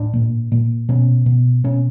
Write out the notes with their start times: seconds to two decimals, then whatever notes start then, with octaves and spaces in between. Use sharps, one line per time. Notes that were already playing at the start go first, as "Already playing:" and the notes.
Already playing: A2 D4
0.14 A#2
0.52 A#2
0.89 B2 C#4
1.26 B2
1.64 B2 C#4